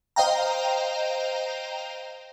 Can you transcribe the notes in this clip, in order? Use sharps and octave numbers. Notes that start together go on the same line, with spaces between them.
C5 D#5 F5 G5 A#5